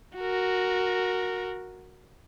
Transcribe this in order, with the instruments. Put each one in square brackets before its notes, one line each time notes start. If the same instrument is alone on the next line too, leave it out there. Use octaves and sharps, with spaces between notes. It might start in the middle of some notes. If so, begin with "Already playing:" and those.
[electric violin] F#4 A#4